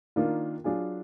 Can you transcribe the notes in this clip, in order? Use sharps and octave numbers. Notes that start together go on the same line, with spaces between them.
D#3 A#3 D4 F4
F#3 D4 F4 G#4